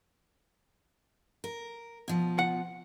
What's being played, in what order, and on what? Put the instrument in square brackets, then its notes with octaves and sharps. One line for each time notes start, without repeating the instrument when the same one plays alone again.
[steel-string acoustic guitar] A#4
B2 F3
[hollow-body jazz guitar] F#5